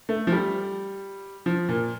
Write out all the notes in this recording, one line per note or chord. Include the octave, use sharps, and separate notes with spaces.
A3
F3
G3
F3
A#2